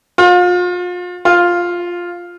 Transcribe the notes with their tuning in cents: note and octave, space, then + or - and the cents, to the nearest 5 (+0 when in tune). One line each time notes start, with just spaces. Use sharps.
F4 +35
F4 +5